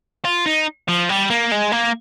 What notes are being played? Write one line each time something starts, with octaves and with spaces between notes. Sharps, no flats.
F4
D#4
F3
G3
A#3
G#3
A#3